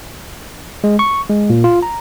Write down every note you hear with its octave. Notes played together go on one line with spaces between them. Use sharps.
G#3
C#6
G#3
A#2
F4
A#5